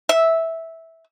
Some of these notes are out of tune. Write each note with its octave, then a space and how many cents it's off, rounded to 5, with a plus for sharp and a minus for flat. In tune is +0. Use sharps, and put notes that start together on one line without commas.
E5 -10